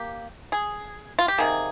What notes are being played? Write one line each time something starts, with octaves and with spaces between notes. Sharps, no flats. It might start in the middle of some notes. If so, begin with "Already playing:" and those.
Already playing: A#3 G4
G#4
F4
G4
C3 D#3 A#3 G#4